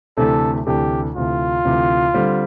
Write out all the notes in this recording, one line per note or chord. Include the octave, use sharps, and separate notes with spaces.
D2 C3 E3 A3 D4 A4
D2 C3 E3 A3 D4 G4
D2 C3 E3 F4
D2 C3 E3
D3 G3 C4